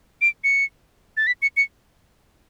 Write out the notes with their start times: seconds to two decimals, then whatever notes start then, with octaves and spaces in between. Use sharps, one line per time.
0.22 D7
0.44 C#7
1.17 A6
1.27 B6
1.42 C#7
1.57 C#7